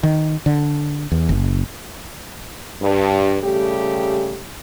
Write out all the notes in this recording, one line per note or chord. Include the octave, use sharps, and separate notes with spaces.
D#3
D3
E2
F#1
G2
C#3 G3 A3 G4